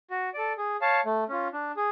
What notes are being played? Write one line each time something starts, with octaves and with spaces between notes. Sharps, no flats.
F#4
A4 D5
G#4
C#5 F5 A5
A3
C#4 F4
D4
G#4